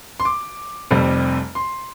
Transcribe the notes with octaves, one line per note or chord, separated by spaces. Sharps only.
C6
D6
F1 F2 C3 G3 C4
C6